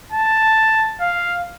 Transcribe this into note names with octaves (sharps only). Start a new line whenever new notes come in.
A5
F5